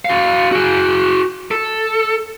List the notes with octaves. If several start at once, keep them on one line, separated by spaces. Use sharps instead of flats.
F#4 F5
F#4 G#4
A4